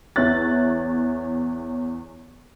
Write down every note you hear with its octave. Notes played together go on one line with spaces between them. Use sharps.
E2 C#5 E5 F#6 A6